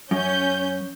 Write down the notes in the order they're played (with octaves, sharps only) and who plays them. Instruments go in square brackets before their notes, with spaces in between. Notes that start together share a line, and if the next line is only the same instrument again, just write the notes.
[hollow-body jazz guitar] F#2 [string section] C#4 G6